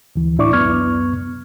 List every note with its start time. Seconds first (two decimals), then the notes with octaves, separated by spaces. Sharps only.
0.16 D2 E3
0.38 A2 D4 E4 D5 C#6 D6
0.53 C#2 F#2 B3 C#6 F6 G#6